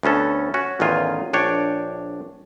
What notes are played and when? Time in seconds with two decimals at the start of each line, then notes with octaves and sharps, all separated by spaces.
0.03 D2 B3 C#4 A4
0.54 C#4 F#4
0.80 A1 E2 D#3 F4 G#5
1.33 A#1 D4 C#5 G5